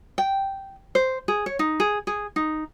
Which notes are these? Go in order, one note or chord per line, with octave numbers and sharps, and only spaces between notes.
G5
C5
G#4
C#5
D#4
G#4
G#4
D#4